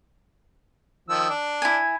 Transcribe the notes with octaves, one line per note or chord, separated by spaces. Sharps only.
D#3 F3 E6
D4
E4 G#5